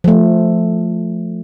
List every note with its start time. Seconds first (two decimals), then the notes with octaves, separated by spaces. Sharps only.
0.04 F3 A3